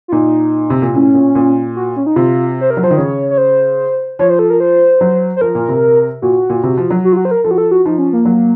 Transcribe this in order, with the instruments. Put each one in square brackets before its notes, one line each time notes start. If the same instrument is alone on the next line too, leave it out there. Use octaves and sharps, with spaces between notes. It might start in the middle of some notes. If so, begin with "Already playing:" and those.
[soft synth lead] F4
[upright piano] A#2 [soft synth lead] D#4
[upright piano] C3
A#2
[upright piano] A2 [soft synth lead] C#4
[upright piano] A#2
A#2
[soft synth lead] F#4
C#4
D#4
[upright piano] C3 [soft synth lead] F4
[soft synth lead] C5
A#4
[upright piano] F#3
[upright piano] F3 [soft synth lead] C5
[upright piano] D#3
[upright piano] C#3 [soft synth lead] C#5
[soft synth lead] C#5
C5
[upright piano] F3 [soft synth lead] C#5
[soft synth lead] C5
A4
A#4
C5
[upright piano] F#3
[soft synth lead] C5
[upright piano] F3 [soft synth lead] A#4
[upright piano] A#2
C3
[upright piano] A#2 [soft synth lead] F#4
[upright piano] A#2
C3
F3
F#3
[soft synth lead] F#4
F4
F#4
C5
A#4
[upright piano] F3 [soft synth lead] A4
[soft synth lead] F#4
A4
F#4
[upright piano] F3 [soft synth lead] D#4
[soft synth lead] C#4
A#3
[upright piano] F#3